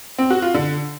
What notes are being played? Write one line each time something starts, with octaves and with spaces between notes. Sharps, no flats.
C4
F#4
F4
D3